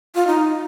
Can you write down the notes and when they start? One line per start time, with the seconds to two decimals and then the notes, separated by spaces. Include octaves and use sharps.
0.15 F4
0.27 D#4